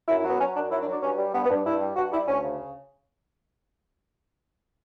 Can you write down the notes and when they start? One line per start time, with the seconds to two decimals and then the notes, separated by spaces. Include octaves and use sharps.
0.08 F#2 E4
0.19 E4
0.24 F#3
0.29 B3
0.39 F#3 C#4
0.55 F#2 D4
0.71 F#3 E4
0.81 D4
0.86 F#3
0.92 D4
1.02 G2 C#4
1.18 G3
1.34 G2 B3
1.44 B3
1.49 G2 D4
1.65 G2 E4
1.80 G3
1.96 G2 F#4
2.12 G3 E4
2.28 D2 C#4
2.43 C#3